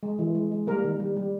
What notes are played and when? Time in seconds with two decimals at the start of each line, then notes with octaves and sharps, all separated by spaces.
0.03 G#3
0.19 E3
0.35 G#3
0.52 G#3
0.67 G3 A#3 A#4
0.84 D#3
1.00 G3
1.16 G3